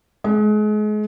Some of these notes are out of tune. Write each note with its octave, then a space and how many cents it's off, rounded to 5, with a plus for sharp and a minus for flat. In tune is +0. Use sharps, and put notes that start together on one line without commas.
G#3 +35